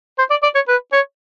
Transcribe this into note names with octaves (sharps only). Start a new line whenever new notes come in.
C5
D5
D5
C#5
B4
C#5